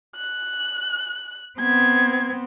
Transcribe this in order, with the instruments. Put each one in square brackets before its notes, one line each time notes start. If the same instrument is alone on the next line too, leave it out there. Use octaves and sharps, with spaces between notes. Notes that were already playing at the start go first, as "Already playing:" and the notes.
[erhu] F#6
[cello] B3 C4 [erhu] G#6